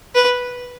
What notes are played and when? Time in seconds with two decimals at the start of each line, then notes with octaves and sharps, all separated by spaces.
0.15 B4